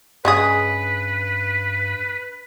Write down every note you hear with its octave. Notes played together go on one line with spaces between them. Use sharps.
G2 C#3 G#3 G#4 B4